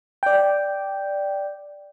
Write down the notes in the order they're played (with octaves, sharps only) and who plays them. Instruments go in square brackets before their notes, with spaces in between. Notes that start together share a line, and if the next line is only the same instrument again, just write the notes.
[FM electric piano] D5 G5